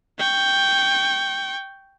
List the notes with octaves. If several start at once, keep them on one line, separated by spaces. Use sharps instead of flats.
G5 C#6